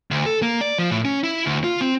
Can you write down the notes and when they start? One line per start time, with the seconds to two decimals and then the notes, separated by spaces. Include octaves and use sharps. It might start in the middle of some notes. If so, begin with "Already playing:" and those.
0.11 D2
0.26 A4
0.42 A#3
0.61 D5
0.79 F3
0.91 A2
1.05 C#4
1.24 E4
1.46 D2
1.64 F4
1.81 C4